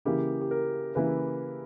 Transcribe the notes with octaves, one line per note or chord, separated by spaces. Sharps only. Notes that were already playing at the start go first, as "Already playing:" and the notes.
C#3 E3 A#3 E4 G4
G4
A#4
C#3 E3 A#3 E4 B4